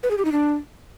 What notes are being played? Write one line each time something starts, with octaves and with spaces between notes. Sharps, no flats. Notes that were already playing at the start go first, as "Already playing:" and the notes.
B4
G#4
G4
D#4
D4